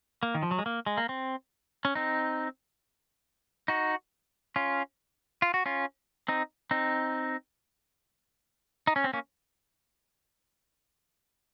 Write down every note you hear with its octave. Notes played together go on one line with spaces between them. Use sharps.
A#3
D#3
F3
F#3
G#3
A#3
G#3
A#3
C4
C#4
C4 D#4
D#4 F#4
C#4 F4
F4
F#4
C#4 F4
C4 D#4
C4 D#4
D#4
C#4
C4
A#3 C#4